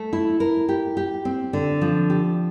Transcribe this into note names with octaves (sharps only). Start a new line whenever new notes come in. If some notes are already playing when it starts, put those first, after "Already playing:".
Already playing: A3
E4
A#4
G4
G4
C4
D3
F3
G4